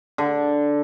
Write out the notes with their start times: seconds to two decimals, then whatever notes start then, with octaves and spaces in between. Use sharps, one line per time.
0.18 D3